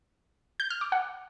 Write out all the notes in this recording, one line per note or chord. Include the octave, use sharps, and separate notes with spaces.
G6
F6
D6
F#5